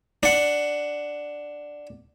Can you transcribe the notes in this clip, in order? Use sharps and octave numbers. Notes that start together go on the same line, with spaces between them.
D4 F#5